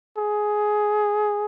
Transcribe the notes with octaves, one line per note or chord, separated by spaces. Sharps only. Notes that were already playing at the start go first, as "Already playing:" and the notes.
G#4